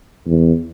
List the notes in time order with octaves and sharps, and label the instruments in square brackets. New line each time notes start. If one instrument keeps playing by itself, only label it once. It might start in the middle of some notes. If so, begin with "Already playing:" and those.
[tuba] E2